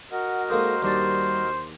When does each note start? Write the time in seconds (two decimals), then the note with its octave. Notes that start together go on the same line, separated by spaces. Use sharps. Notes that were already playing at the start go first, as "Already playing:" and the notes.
0.12 F#4 A#4 D#5 F#5
0.50 G#3 A#3 D#4 A4 C5
0.82 D#2 G3 D4 C5 A5